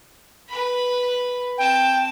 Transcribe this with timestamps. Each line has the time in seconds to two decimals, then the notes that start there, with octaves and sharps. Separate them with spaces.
0.48 B4 B5
1.57 C4 G5 A5